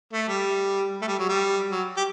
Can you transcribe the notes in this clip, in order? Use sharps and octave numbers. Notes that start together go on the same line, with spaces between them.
A3
G3
A3
G3
F#3
G3
F#3
G4